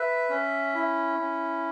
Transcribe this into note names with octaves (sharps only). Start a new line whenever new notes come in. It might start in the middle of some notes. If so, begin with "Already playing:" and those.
Already playing: B4 E5
C#4
E4
C#4